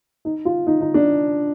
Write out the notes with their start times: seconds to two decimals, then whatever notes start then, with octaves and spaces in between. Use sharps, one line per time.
0.25 D#4
0.45 F4
0.67 D#4
0.81 D#4
0.94 D4